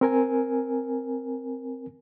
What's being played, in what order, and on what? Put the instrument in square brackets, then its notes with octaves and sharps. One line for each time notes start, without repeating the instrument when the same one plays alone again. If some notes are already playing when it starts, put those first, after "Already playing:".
[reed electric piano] C4 A#4 G#5